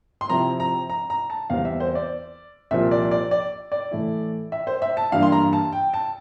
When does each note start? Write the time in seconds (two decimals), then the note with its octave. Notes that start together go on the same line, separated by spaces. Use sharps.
0.21 C6
0.30 C3 F3 C4 E4 A#5
0.60 A#5
0.90 A#5
1.10 A#5
1.30 A5
1.50 E2 E3 G3 C4 F5
1.65 E5
1.80 C5
1.95 D5
2.71 C2 A#2 F3 E5
2.91 D5
3.11 D5
3.31 D5
3.72 D5
3.91 A2 E3 A3 E4
4.52 E5
4.67 C5
4.82 E5
4.97 A5
5.12 G2 E3 A#3 D4 F5
5.23 C6
5.32 A#5
5.53 A5
5.73 G5
5.94 A5